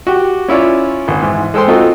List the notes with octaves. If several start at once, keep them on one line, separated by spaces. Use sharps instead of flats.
F#4 G4
C#4 E4 F4 C#5 D5
G#1
G#2 E3
G#3 A4 C5 G5 C6
C4 D#4 F4 F#4 A4